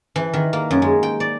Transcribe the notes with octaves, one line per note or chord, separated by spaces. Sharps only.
E3
D#3
A#3
F#2
G#3
G5
D5